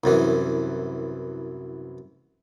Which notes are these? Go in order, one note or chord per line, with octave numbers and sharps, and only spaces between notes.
C2 F#2 E3